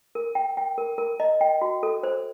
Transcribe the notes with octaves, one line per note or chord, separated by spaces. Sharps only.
A#4
G5
G5
A#4
A#4
D#5
G5
F#4
A4
C5